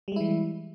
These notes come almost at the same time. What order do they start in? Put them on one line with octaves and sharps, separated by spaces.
G3 G#3 E4 E3